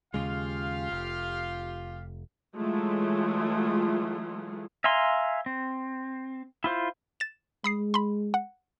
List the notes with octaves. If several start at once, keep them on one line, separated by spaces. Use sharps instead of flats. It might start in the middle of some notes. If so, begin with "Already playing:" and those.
D#2 C#3 G#3 F4 G4 F5
F1
E3 F#3 G#3 A3 F4
E5 F5 G#5 A#5 C6
C4
E4 F4 C5
A6 E7
G#3 B5 D#6 C7
B5 C6
F#5